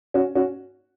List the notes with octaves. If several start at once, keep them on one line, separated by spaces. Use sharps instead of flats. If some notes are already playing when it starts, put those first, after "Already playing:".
C#4 F#4
C#4 F#4